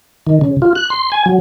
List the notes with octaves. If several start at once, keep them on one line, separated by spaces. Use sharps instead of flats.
D#3
C#3
F4
F#6
C6
G#5
F#3